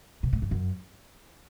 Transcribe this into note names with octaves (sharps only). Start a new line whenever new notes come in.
B2
A2
G2
F#2